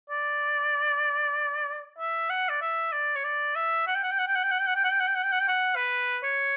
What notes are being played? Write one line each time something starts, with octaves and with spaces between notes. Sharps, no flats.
D5
E5
F#5
D5
E5
D5
C#5
D5
E5
F#5
G5
F#5
G5
F#5
G5
F#5
G5
F#5
G5
F#5
G5
F#5
G5
F#5
G5
F#5
G5
F#5
G5
F#5
B4
C#5